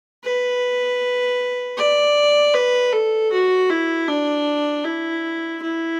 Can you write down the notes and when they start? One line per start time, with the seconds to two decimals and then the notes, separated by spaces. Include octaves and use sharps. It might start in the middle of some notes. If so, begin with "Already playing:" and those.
0.23 B4
1.77 D5
2.54 B4
2.92 A4
3.32 F#4
3.70 E4
4.08 D4
4.85 E4
5.62 E4